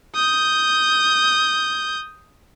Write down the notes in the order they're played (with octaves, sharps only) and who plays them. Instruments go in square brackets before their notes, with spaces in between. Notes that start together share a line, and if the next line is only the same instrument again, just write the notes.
[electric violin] D#6 G6